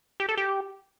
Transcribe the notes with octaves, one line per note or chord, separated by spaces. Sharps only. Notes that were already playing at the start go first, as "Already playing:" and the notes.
G4
A4
G4